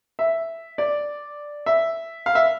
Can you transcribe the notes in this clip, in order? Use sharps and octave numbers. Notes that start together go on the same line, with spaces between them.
E5
D5
E5
F5
E5